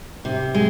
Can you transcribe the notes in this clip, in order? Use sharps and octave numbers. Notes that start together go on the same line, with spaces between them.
C3
G#3